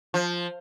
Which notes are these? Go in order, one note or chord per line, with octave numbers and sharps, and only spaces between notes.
F3